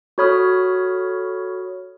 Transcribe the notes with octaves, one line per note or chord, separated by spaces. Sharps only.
F#4 A4 C#5 B5 D#6 F6